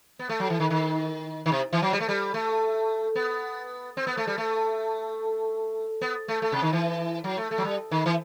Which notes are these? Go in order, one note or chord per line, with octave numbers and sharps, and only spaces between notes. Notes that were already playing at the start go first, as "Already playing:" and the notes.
B3
A3
F#3
E3
D#3
D#3
D#3
C3
E3
F#3
G3
A3
G3
A3
B3
C4
B3
A3
G3
A3
B3
A3
A3
C3
D#3
E3
F#3
A3
A3
F#3
G3
D#3
E3